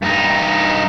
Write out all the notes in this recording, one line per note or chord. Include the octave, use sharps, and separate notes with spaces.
G2 D#4